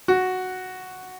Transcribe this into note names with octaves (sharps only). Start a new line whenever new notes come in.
F#4